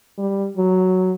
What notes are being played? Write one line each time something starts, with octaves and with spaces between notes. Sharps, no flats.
G3
F#3